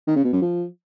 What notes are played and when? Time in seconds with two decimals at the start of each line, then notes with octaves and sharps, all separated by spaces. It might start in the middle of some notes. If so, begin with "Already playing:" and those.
0.07 D#3
0.16 C#3
0.24 B2
0.33 F#2
0.41 F3